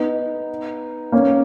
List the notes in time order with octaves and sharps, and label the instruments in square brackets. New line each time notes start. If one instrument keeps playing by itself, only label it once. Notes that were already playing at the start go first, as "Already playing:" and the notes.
Already playing: [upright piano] B3 D#4
A#3 C#4